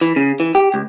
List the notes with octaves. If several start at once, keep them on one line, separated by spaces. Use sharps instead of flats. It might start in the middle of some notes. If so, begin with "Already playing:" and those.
E3
C#3
E3
G4
C#2